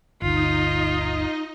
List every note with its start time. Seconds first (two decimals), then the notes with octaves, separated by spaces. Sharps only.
0.22 G1 D2 D#4 F4 D#5